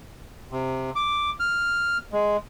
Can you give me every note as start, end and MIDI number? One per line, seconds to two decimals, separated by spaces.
0.52 0.91 48
0.96 1.30 86
1.40 1.98 89
2.13 2.37 56